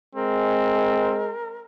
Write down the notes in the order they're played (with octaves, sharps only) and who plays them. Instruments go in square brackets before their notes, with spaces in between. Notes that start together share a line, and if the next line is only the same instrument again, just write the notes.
[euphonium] G#3 [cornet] C4 [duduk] A#4